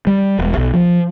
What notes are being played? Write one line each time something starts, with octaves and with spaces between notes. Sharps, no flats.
G3
E1
B1
F3